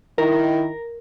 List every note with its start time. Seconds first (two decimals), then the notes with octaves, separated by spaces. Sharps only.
0.18 D#3 E4 A#4